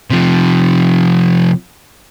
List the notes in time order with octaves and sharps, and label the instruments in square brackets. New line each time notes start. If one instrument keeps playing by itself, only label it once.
[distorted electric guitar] C3 F3